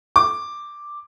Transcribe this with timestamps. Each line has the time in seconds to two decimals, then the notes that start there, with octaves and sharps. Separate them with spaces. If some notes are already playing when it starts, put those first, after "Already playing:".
0.16 D6